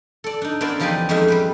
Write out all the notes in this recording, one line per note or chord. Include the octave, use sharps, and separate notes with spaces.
A4 D5
D4 D#4
B3 C#4 E4 A#4 C5 D5
E2 F3 D#4 G4 D5 G#5
F2 G#3 C#4 D#4 E5
G3 G4 B4